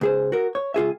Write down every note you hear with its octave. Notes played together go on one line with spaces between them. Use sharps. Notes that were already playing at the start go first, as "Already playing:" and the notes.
C#2 G#4 C5
F#4 A#4
C#5
C#2 F4 G#4 E5